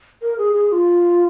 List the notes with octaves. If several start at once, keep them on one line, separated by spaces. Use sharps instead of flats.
A#4
G#4
G#4
G#4
F4